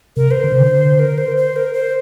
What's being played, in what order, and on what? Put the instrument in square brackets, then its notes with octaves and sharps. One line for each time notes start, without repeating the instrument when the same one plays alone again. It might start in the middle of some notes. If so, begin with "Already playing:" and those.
[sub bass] C3 [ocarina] A#4
[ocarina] C5
[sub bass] D3
C3
D3
[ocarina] A#4
C5
C5
A#4
C5